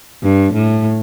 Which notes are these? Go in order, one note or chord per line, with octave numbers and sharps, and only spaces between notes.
G2
A2